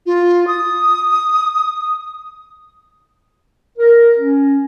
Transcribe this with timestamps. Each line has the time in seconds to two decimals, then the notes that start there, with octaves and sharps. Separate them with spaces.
0.06 F4
0.48 D#6
3.78 A#4
4.19 C#4